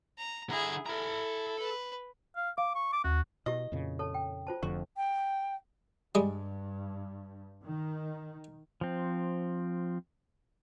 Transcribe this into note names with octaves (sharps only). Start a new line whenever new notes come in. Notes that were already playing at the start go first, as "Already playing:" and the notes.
A#5
D3 E4 G#4 A#5
E4 A4 A#5
B4
F5
F5 D6
C#6
D6
D#2 F#4
B2 E4 G4 D#5
F2 A#2 C#3
A4 C#5 A5
G5
F4 C5 A5
F1 F2 D3 F#4
G5
G2 G3 G#3
D#3
F3 C4